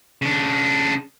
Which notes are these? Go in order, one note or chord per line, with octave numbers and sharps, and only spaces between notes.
C#3 D4